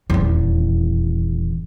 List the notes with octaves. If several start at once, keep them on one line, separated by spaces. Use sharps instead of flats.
D#1 E2